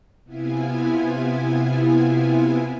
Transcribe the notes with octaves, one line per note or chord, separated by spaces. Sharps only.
C3 B3 E4 F4 G#5